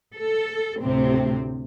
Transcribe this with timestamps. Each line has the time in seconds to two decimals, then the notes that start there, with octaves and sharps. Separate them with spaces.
0.17 A4
0.81 D2 A2 C3 C4